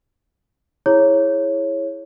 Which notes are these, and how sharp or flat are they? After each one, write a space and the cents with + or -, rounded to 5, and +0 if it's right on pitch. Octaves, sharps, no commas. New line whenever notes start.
E4 +0 G#4 +0 C#5 -10